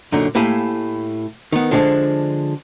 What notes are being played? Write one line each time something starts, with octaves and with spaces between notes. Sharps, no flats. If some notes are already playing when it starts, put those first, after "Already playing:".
F#2 A#2 D3 D#4
A2 A#3 E4 G4 F5 G#5
D#3 B3
D3 F3 G#3 C4 D4